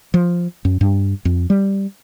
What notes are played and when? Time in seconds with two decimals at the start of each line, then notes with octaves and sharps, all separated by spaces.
0.14 F3
0.65 F#2
0.81 G2
1.25 F2
1.50 G3